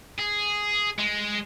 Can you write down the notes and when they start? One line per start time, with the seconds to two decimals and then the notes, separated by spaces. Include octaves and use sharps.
0.19 G#4
0.98 G#3